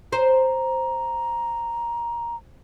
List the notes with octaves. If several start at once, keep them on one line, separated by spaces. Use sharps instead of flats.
C5 A#5